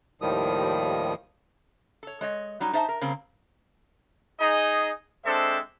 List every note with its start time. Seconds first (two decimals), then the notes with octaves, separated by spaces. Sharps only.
0.21 D#2 A2 D#3 F3 G3 D#6
2.03 A4 C#5
2.21 G#3 C#5 D#5
2.60 F#3 G3 D#4
2.73 D#4 C5 E5 A5
2.89 A#4
3.01 C#3 G3 A#3 C4
4.39 D#4 G#4 D#5
5.24 G#3 C4 D4 A4 C5 E5